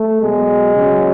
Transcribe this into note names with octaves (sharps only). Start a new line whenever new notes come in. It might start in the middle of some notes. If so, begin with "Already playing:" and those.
Already playing: A3
B2 F#3 G#3
C#3 F#3